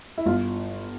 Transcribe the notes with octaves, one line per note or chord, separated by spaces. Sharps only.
E4
G1 F4